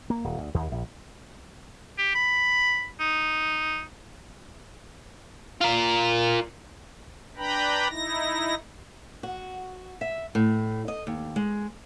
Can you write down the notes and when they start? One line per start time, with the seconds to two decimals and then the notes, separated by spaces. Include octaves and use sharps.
0.10 A#3
0.24 D#1
0.38 D2
0.54 D#2
0.72 A#1
1.98 G4
2.15 B5
3.00 D#4
5.61 F4 A#4
7.37 D4 B4 G5 A#5 B5
7.90 D#4 E4 A#6
9.23 F#4
10.01 E5
10.35 A2
10.88 D#5
11.07 D#2
11.36 G#3